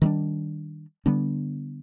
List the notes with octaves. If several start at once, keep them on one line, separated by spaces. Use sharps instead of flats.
D#3 G3 B3 D4
D3 G3 B3 D4